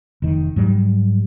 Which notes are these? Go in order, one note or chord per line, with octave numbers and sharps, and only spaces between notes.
F1 D#3
G#2 F#3 G3